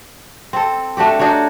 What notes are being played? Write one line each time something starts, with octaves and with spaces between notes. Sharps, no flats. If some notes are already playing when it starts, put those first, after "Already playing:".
C4 A4
A3 D4 F#4 G4
D4 D#4 F#4 C#5